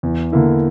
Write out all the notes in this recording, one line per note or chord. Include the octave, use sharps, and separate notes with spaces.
E2
D3 A#3 E4